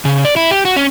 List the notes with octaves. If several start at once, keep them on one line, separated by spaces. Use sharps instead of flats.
C#3
D5
E4
G4
F#4
C#4